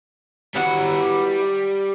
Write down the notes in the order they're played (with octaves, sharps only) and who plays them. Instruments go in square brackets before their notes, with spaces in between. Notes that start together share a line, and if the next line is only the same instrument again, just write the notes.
[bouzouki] E3 B3 F#4 [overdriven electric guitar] G3 F#5